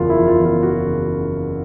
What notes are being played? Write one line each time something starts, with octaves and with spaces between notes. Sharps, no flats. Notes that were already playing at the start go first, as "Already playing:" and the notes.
Already playing: F#1 E2 C#3 F3 F4 F#4
E4
F3
F4
E2
F4
F#1 F#4
C#3